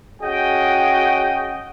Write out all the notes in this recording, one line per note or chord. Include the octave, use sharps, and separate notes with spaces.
C#4 F#4 G#4 D#5 G5